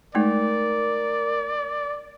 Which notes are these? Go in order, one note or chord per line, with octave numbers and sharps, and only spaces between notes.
G#3 A3 D#4 A#4 D5